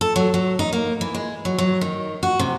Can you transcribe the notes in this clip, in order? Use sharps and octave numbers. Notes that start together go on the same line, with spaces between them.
A4
F#3
F#3
D#4
A#3
E3
G#3
F#3
F#3
D#3
F#4
C3